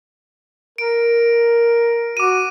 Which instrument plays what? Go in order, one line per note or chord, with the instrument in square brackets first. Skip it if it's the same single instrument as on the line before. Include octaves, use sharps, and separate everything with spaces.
[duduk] A#4 [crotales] D7
[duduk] F#4 [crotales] D6 D#7